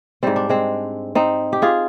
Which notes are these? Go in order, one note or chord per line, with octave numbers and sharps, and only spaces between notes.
G#2 G3 C4
D4
G#3 C4
C4 D#4
G4
F4 G#4